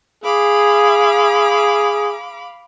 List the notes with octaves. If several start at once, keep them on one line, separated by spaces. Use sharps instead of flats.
G#4 F5 B5 D6